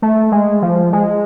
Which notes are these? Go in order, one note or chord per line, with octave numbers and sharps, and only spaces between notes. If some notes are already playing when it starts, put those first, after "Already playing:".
A3
G#3
F3
G#3